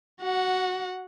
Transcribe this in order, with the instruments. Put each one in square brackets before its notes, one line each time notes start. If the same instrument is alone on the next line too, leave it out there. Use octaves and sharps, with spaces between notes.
[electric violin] F#4 F#5